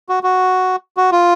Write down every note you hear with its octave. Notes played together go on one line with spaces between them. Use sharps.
F#4
F#4
F#4
F4